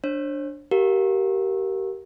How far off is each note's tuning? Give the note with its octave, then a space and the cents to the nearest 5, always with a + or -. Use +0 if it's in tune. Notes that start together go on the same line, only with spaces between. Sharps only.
D4 +0 C5 +45
G4 -25 A#4 +0 F5 +20